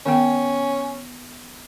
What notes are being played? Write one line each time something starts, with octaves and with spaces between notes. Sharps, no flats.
D#3 B3 C#4 G5